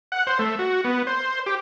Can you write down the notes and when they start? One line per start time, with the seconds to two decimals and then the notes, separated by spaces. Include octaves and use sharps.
0.12 F#5
0.27 C5
0.39 A3
0.59 F#4
0.85 B3
1.07 C5
1.46 G4